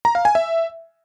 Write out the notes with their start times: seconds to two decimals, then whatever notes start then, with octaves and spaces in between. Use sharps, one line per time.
0.05 A#5
0.15 F5
0.25 G#5
0.35 E5